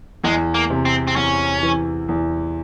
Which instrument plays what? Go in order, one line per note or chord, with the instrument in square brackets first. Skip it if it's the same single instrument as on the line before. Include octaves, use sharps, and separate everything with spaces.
[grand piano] E2 [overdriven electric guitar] G#3
[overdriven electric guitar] A#3
[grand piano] C3
[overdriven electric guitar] C4
C4
[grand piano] E2 [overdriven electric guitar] C#4
[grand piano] E3
E2